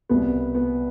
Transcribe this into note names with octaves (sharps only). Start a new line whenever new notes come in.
C2 B2 B3
B3